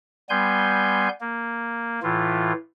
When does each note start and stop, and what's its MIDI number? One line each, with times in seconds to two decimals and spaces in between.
0.30 1.09 55
0.30 1.09 59
0.30 1.09 80
0.30 1.09 84
0.30 1.09 91
1.21 2.00 58
2.03 2.52 45
2.03 2.52 52
2.03 2.52 65